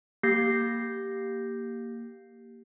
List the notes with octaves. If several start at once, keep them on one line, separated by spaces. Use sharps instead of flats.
A#3 G4 G6 A#6 C7